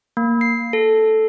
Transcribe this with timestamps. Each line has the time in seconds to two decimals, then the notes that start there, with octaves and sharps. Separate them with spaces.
0.17 A#3
0.41 C7
0.73 A4